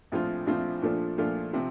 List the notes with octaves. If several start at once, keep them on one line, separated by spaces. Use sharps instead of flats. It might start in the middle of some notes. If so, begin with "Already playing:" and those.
A#1 A2 F3 C4 F4
A#1 A2 F3 C4 F4
A#2 F3 A3 D4 F4
A#2 F3 A3 D4 F4
C3 F3 C4